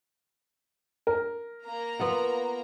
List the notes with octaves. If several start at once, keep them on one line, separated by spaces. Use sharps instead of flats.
A#4
A#3 A#5
B3 F4 F#5